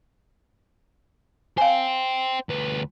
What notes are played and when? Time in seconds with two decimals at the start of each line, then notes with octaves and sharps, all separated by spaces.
1.58 C5 F5 G5 G#5
2.49 D2 B4